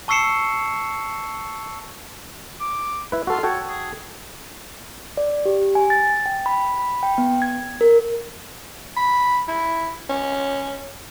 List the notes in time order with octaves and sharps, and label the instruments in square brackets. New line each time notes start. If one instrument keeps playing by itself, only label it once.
[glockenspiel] A5 C#6 E6 C7 C#7 E7
[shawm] D6
[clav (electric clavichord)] E4 B4
[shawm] F4 [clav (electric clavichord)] F#4 A4
[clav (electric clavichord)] F#4 A4 G5 [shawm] C#5
[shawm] G#4
[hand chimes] D5
G4
G#5
A6
G5
B5
B5
G5
B3
G#6
A#4
[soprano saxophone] B5
E4
C#4